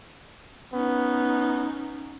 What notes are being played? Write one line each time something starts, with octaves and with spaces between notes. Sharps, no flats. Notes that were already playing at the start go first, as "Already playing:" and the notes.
B3 C#4 D#4